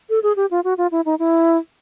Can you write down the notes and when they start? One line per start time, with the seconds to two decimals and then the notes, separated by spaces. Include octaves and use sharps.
0.10 A4
0.23 G#4
0.36 G4
0.51 F4
0.64 F#4
0.78 F4
0.91 E4
1.05 D#4
1.19 E4